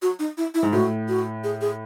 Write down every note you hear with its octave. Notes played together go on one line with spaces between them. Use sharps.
F#4
D#4
E4
E4
G#2
A2 F#4
F#4
G#4
G#4